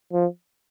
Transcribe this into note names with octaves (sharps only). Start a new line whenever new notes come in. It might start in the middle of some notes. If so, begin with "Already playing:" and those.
F3